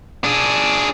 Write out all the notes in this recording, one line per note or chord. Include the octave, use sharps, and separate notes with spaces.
D4 G#4